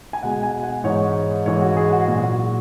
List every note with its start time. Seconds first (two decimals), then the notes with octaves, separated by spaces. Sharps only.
0.13 G#5
0.23 B2 G#3 F#5
0.43 G#5
0.63 F#5
0.84 G#2 E3 G#3 C#5
1.46 G#2 E3 G#3 C#5
1.61 F#4
1.77 G#4
1.92 F#4
2.08 A#2 F#3 F#4
2.23 F#4